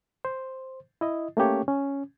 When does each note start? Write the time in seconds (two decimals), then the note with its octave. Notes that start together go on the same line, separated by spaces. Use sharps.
0.25 C5
1.01 E4 D#5
1.37 A3 A#3 C#4 G4 C#5
1.68 C#4